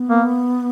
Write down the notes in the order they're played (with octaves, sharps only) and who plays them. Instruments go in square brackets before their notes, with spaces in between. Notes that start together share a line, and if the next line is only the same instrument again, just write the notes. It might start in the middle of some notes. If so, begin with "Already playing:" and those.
Already playing: [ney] B3
[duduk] A#3